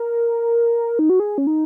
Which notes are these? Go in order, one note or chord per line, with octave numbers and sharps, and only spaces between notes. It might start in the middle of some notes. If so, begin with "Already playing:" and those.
Already playing: A#4
D#4
F#4
G#4
C#4
D#4